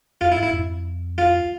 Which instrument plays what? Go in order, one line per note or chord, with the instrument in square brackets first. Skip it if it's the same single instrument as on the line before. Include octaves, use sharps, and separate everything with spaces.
[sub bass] F2 [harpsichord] F4
[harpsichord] E4
[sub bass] G#2
[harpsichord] E4
[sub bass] F2
[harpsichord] F4